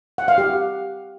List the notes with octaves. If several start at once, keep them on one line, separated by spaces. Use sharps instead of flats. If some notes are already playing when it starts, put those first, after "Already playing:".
F#5
F5
G4